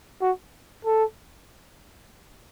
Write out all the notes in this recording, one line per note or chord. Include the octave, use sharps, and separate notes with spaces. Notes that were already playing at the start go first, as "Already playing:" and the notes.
F#4
A4